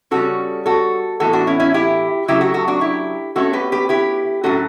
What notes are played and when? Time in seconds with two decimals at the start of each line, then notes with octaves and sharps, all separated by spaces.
0.11 C#3 G3 C#4 F#4 A4
0.66 F#4 A4
1.20 A2 E3 B3 F#4 A4
1.33 D4 F#4
1.47 C#4 E4
1.60 C#4 E4
1.74 E4 G4
2.28 C#3 F#3 A3 E4 G4
2.41 F#4 A4
2.54 F#4 A4
2.68 D4 F#4
2.81 E4 G4
3.36 B2 A3 C#4 F#4 A4
3.53 G4 B4
3.72 G4 B4
3.89 E4 G4
4.44 A2 F#3 C#4 F#4 A4